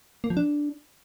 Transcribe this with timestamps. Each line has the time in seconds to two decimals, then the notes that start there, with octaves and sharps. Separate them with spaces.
0.24 A#3
0.30 F3
0.37 D4